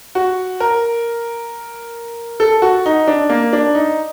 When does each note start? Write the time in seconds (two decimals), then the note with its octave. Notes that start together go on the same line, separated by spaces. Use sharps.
0.15 F#4
0.60 A#4
2.40 A4
2.62 F#4
2.86 D#4
3.07 D4
3.30 A#3
3.53 D4
3.75 D#4